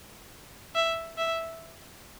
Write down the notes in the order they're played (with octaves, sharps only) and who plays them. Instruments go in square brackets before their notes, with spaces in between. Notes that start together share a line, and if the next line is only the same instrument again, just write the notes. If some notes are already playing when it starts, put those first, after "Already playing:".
[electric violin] E5
E5